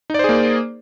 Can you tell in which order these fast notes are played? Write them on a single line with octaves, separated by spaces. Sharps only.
D#4 D5 C5 G#4 A#3